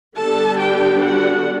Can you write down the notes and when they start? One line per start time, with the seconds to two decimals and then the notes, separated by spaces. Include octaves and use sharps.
0.17 D3 G3 B3 D4 A4 A5
0.58 G4 G5
1.00 F#4 F#5